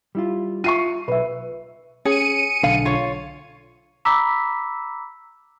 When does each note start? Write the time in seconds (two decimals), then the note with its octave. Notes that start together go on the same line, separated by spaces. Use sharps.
0.15 G3 E4 F4
0.64 F4 E5 C#6 C7 D#7
1.08 B1 B4 E5
2.05 C#4 G#4 C#7 D#7
2.63 B1 D3 F5
2.85 F4 C#5
4.05 A#5 B5 D6 E6 B6